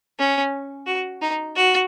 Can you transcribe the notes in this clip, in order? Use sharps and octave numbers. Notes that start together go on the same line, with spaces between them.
C#4
F#4
D#4
F#4